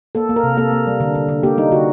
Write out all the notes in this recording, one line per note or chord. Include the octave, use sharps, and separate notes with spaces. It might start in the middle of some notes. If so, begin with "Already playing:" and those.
A#3 A4
A#3
A#4
C3
A#3 A4
A#3
G3
D3
D3
D3
A#3 G4
G3 D#4
D3 F#4